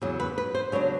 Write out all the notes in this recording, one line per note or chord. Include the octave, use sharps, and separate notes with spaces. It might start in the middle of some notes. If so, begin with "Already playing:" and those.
E2 C#3 F#3
B4
B4
C5
C#3 F#3 B3 D4 C#5